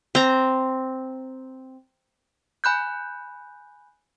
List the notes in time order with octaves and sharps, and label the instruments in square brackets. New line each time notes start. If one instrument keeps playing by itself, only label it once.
[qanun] C4 A#5
[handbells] G#5 B5 F#6 G6